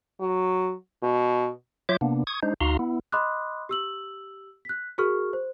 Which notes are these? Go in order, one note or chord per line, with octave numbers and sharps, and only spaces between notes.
F#3
B2
F#3 F4 C#5 E5 D6 G6
C3 A#3 B3 D4
C#6 D#6 G#6
G#3 D4 D#4 C5
D2 D#4 F#4 F5 A#5 C6
B3 E4
D#5 B5 C6 D6 D#6 F#6
G4 E6 F#7
F#6 B6
F#4 G#4 A#4 C#6 F6
C5